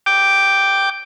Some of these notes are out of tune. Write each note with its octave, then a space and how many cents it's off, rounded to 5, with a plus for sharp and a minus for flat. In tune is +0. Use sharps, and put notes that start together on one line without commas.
G5 +0 D6 +0